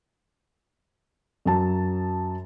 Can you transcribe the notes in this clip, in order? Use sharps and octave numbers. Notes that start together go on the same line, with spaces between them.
F#2 F#3 A5